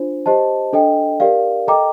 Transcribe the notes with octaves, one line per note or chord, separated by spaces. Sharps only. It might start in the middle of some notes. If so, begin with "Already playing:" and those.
Already playing: D4 F4 C5
G4 C5 D#5 A5
D4 A4 D#5 G5
G4 A#4 D5 F5
A4 D#5 G5 A#5 D6